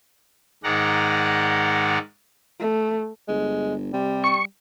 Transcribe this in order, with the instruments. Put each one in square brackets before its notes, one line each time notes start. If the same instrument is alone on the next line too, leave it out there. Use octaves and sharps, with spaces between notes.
[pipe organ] G#2 D#3 G#3 D5 F#5 A#5
[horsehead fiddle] A3
[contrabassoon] G1 [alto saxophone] G#3
[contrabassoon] C3 [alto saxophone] G3
[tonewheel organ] C#6